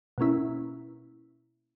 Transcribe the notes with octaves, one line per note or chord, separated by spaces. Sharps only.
B2 A#3 C#4 E4